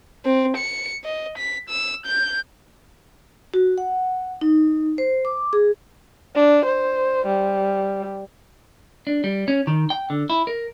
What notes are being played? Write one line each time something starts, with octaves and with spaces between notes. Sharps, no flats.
C4
C#7
D#5
B6
E6
G6
F#4
F#5
D#4
C5
D6
G#4
D4
C5
G3
D4
G3
C#4
D#3
G5
D3
E4
A#4